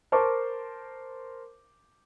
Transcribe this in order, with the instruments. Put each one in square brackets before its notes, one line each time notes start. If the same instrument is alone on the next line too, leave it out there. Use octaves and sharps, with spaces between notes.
[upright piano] A#4 C5 A5 C#6 D6